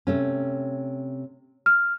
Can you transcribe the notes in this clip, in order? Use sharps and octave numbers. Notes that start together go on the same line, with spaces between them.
C3 A3 C#4
F6